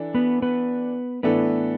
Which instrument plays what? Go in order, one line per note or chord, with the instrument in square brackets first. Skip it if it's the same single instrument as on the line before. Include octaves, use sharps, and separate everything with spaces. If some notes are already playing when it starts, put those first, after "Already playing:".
Already playing: [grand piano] E3 D4 A4
[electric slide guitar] B3 B4
B3 B4
[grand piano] A2 E3 D4 A4 [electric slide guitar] B3 B4